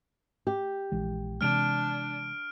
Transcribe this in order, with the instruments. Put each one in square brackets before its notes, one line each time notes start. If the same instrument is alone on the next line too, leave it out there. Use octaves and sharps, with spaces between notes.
[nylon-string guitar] G4
[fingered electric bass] A#1 E3 G#3
[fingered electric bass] C3 E3 G#3 [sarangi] D4 [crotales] F6 D7